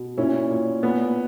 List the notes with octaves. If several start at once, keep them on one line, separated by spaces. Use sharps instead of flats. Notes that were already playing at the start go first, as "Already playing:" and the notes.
Already playing: B2
A#2 C#4 E4
A#2
A#2 B3